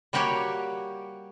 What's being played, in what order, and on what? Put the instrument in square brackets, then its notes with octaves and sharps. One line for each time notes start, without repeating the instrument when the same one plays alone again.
[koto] G3 A#3 F#4 G4 C#5